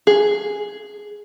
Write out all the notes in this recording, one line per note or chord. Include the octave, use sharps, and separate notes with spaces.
G#4